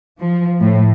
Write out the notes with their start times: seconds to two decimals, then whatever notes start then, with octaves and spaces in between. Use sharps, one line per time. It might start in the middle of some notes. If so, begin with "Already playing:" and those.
0.19 F3
0.60 A2